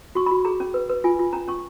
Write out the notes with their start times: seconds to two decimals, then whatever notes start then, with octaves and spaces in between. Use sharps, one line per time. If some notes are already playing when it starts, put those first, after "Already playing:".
0.15 F#4 C#6
0.26 B5
0.31 F#4
0.45 G#4 A#5
0.60 C#4
0.74 B4
0.90 B4
1.04 F4 G#5
1.19 F4
1.33 C#4 A#5
1.48 C#4 C#6